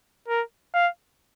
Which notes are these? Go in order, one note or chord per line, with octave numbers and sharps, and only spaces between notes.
A#4
F5